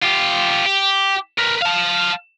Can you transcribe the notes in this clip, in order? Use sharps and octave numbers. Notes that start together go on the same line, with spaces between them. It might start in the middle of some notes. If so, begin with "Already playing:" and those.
F4 G4
G4
A#4 B4
F5 A5